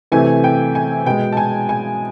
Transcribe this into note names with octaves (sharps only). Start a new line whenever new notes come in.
C3 E3 A3 G#5
G5
G#5
B2 G#3 G5
A5
G#5
G#5